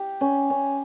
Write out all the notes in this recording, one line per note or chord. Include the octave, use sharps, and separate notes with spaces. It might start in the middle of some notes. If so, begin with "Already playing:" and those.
Already playing: G4
C#4
C#4